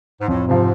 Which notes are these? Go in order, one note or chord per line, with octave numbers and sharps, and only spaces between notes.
G#2
F2 A2
G#2 C3 F3